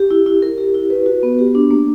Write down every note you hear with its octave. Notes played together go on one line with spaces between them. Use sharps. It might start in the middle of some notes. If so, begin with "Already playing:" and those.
Already playing: G4
E4
E4
A#4
G4
E4
B4
F#4
B3
G4
D4
A#3